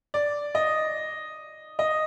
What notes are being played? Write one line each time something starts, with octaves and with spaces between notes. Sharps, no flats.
D5
D#5
D#5